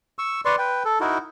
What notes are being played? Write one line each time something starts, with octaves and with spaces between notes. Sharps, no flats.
C#6 E6
B4 D5 C6 C#6
B4 G5
A4
D#4 E4 F#4 A#4